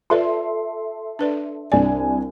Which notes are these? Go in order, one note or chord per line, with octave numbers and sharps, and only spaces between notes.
F4 A4 B4 D5 E5 C6
D4 B4 D5
C2 D4 D5 G#5